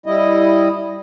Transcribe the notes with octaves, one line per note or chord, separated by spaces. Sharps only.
G3 E4 D#5